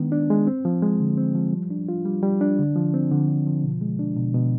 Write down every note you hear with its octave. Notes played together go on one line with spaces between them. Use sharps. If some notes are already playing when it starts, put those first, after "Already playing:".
Already playing: D#3 G#3 B3 D4
D4
G#3
C4
F3
G#3
D3
C4
F3
G3
D4
F4
G3
G3
D4
D3
F3
C4
D3
D3
F3
B2
G#3
D4
B2
B2